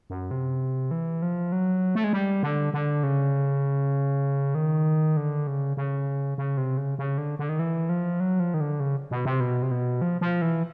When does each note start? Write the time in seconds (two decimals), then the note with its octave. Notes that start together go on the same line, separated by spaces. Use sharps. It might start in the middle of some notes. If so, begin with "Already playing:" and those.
0.10 F#2
0.31 C3
0.91 E3
1.22 F3
1.52 F#3
1.95 A3
2.04 G#3
2.13 G3
2.43 D3
2.74 D3
3.03 C#3
4.55 D#3
5.17 D3
5.47 C#3
5.77 C#3
6.38 C#3
6.57 C3
6.77 C#3
6.99 C#3
7.18 D3
7.39 D3
7.49 D#3
7.59 E3
7.89 F3
8.20 F#3
8.40 F3
8.54 D#3
8.61 D3
8.80 C#3
9.11 B2
9.25 C3
9.40 B2
9.62 C3
9.71 B2
10.02 F3
10.21 F3
10.42 E3